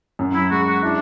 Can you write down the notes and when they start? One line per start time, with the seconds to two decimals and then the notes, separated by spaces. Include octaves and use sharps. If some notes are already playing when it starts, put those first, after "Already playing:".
0.19 F#2
0.34 E4
0.50 G#3 F#4
0.67 F#4
0.82 D4 E4